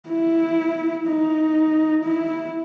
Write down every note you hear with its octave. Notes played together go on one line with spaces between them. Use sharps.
E4
D#4
E4